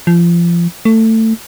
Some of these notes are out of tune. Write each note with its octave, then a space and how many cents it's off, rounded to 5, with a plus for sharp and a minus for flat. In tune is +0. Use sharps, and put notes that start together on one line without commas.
F3 -30
A3 +20